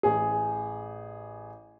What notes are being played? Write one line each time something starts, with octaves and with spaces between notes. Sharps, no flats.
A1 G#4